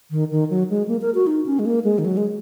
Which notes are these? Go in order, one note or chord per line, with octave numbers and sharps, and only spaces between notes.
D#3
D#3
F#3
G#3
A#3
A#4
F#4
D#4
C#4
G#3
A#3
G#3
D#3
F#3
G#3